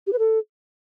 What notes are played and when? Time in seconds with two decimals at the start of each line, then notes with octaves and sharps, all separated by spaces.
0.07 G4
0.13 B4
0.19 A4